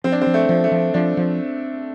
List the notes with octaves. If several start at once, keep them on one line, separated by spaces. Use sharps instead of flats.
F3 C4
D4
C4
F3
A3
F3
A3
F3
F3 D4
F3